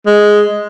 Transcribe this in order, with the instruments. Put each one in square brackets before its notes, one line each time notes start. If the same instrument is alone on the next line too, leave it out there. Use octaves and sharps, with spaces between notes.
[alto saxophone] G#3